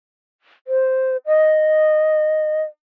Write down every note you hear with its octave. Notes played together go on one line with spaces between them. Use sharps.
C5
D#5